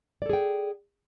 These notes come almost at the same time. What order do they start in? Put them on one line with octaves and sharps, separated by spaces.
D5 A4 G#4 G5